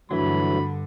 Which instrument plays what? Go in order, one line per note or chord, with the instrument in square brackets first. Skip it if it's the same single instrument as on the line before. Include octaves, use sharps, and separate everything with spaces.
[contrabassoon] D2 [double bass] G2 D3 [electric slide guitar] E3 F#3 [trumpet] B5